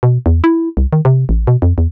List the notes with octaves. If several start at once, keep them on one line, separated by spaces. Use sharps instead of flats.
B2
E2
E4
C2
D#3
C3
A1
B2
F2
E2